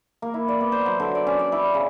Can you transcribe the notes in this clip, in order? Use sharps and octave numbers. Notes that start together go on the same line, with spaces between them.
A#3
E4
D5
B3
C5
F#3
D3
D5
C#4
D5
E4
C#3